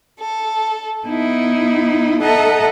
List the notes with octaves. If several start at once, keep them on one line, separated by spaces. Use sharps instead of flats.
A4
B3 D#4 E4
A4 D#5 E5 F#5 A5 A#5